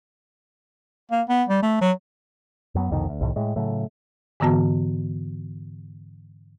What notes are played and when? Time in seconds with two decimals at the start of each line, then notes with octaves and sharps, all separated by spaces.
1.11 A#3
1.29 B3
1.48 G3
1.62 A3
1.81 F#3
2.75 F#2 F#3 B3
2.91 C2 F2 B2 D#3
3.09 D2
3.21 C2 A2 D#3
3.36 A2 G#3
3.56 A2 C#3 F#3 A3
4.40 G#2 D3 E3 B3 F#4 A5